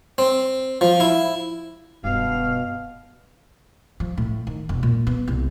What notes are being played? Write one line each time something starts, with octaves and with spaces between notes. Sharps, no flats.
C4
F3
E4
E1 G2 B2 F5
F3
A2
D#3
E1
A#2
B3
C2